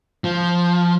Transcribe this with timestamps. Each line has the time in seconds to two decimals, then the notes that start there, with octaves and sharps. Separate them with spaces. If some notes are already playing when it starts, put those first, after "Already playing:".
0.24 F3